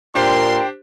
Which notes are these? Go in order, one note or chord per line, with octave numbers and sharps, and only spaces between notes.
A#2 D4 G4 A#4 C5 G5 C6